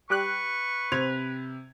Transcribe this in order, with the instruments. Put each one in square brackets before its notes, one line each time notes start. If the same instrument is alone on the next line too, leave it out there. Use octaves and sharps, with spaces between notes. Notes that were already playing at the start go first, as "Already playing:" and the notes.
[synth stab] G3 G4 F#6 [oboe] B4 [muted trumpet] C#6
[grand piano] C3 G#6 F7 [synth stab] C5